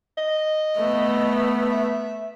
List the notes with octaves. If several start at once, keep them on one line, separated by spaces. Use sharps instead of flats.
D#5
A3 B3
E5